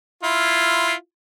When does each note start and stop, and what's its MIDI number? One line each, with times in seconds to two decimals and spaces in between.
0.23 0.94 64
0.23 0.94 65